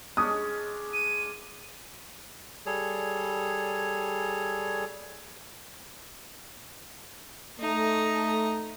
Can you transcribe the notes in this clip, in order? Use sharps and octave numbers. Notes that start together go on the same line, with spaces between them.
G#3 C#4 D4 D#6
D#7
G3 G#4 A4 C#5
A3 D#4 A#5